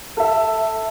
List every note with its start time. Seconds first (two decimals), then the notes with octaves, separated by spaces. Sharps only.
0.17 A4 E5